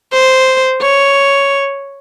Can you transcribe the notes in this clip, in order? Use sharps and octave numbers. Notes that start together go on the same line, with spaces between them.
C5
C#5